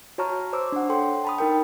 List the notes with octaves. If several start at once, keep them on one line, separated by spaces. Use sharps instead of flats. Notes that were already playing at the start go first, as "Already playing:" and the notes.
F#4 C#5 A5 A#5 C#6 F6
C5 C#5 C6 D6 E6
D4 F#5
A4 G5 C6
A5 B5 D#6
D#4 A#4 G5